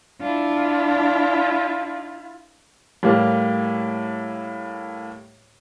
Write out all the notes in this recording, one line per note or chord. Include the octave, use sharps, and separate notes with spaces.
D4 E4 F4
A2 G3 A#3